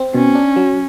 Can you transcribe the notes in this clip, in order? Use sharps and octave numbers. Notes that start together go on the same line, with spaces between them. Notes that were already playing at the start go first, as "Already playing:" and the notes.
Already playing: C4
B2 C#4
D4
F#3